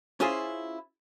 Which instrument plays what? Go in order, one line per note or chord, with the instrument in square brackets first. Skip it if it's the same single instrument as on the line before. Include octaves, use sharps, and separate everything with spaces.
[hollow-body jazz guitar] C#4 E4 F4 G#4 C5